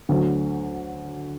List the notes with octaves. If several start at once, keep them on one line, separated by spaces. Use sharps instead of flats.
D2 D3 F#3 A3